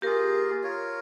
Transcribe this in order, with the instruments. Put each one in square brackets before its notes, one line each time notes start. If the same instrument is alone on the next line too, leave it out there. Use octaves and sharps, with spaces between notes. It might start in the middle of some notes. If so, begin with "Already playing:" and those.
[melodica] A#3 F4 G#4 [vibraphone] G4 A#4
[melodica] F4 A#4 C#5